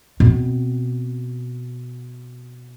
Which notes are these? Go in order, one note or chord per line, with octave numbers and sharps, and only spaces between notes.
B2 C4